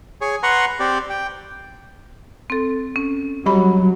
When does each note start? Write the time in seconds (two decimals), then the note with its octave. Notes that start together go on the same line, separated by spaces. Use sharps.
0.21 G#4 C#5
0.43 B4 F#5 A#5 C6 C#6
0.80 C4 G4 D5
1.10 G5
2.50 C4 A4
2.96 C#4
3.46 F#3 G3 G4 B5